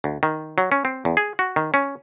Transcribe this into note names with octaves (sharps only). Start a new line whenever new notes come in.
D2
D#3
F#3
C#4
C4
E2
G#4
F#4
D#3
C#4